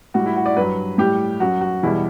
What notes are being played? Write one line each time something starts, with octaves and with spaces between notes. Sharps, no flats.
A2 G3 F#4
E4
F#4
D5
G2 F#3 B4
A2 G3 G4
F#2 F#3 F#4
F#4
E2 B2 G3 E4